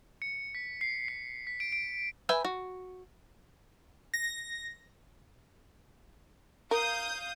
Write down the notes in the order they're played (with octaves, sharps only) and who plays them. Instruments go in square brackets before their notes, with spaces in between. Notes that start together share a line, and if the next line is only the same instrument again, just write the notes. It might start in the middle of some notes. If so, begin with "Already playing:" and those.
[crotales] C#7
B6
C7
C7
B6
D7
D7
[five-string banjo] B4 E5 G5 G#5
F#4
[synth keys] A#6
[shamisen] A#4 [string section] F5 D#6 G6